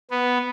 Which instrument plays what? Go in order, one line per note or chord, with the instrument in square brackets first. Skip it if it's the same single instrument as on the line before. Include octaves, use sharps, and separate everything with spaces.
[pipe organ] B3